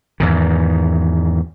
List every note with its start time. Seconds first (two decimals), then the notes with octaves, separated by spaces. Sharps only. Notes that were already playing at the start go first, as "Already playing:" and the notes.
0.20 E2 G#2 D#3